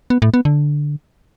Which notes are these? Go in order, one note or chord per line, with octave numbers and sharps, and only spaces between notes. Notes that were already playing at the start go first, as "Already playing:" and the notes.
B3
A2
B3
D3